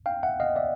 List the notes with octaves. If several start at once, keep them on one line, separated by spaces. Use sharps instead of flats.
F5 G5
E5 F#5
D#5 F5
D5 E5